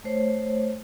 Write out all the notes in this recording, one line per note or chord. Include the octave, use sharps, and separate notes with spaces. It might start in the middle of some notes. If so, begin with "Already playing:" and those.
A3 C5 C#5